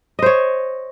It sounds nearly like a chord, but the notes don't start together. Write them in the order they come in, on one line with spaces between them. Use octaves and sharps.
D#5 C5 C#5